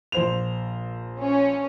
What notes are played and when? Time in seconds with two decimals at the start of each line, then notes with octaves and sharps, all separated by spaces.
0.12 A#1 C5 F7
1.21 C#4